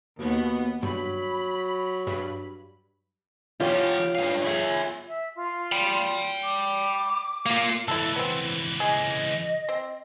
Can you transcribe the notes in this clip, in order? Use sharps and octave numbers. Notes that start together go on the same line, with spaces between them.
D#2 B2 B3
G2 F#3 B5
G2
F3 F4 G4 C#5
G2 F5 D#7
G#4 E5
E5
F4
G5 B5
D6
A#3 F4
C#2 E3 E4 A4
B3 C4
G#4 D#5
C4